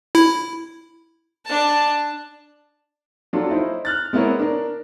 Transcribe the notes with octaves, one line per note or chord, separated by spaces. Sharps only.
E4
D4 A5
F#3 D4 F4 A4
D#4 E4 C5
F6 F#6 A6
G#3 B3 C4 E4 A#4 C#5
D4 A#4